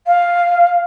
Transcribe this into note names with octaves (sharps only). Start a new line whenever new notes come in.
F5